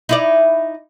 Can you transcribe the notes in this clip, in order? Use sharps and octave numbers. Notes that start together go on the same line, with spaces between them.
D#4 E4 D5